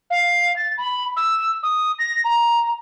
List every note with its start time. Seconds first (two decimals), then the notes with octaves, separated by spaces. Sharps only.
0.10 F5
0.56 A6
0.77 B5
1.16 E6
1.63 D#6
1.98 A#6
2.24 A#5